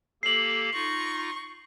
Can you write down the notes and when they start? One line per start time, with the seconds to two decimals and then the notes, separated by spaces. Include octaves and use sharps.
0.23 A#3 G4 A4 C7 F#7
0.74 D#4 F4 C#6 A#6